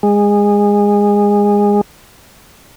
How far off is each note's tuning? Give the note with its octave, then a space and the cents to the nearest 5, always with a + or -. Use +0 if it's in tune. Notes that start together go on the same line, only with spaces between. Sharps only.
G#3 -20